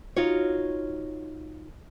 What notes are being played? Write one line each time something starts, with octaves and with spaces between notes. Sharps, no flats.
D#4 F4 F#4 C#5